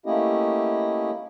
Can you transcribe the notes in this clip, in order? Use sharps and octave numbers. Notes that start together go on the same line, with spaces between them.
A3 A#3 C#4 E4 G4 D#5